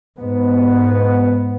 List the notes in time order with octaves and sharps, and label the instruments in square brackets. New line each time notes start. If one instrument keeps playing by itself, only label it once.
[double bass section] G#2 B3